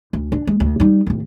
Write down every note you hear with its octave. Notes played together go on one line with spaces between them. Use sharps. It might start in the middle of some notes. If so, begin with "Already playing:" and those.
D2
D4
G#3
D2
G3 D#4
D1 D#3